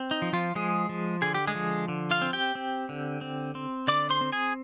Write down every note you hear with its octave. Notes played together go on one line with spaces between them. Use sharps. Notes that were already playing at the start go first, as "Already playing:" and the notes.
Already playing: C4
D#4
F3
F3 F4
F3 G#3 G#4
F3
D3 G#4
G4
G#3 G#4
F3
D3
F4 F5
C4
G4 G5
C4
D3
C4
C4
D3 D5 D6
C5 C6
C4
G#4 G#5